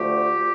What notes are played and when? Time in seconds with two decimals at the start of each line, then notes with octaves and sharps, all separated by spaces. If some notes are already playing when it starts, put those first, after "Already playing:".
Already playing: D2 D3 F3 A3 F4 G4